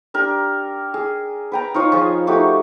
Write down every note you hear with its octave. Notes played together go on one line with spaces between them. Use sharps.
D4 G4 A#4
G#4
B4 G5 A#5
D#4 F4 C#5 D#5
F3 G#4
A3 D#4 F#4 G4